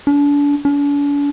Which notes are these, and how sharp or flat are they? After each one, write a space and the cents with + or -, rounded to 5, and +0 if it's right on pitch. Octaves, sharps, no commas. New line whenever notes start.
D4 -35
D4 -45